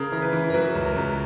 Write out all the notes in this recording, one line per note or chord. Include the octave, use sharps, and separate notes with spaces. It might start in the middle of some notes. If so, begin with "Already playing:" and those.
Already playing: C#3 A#4
E3 A#4
B4
E3
A#4
F#3 B4
C#2
A#4
C#2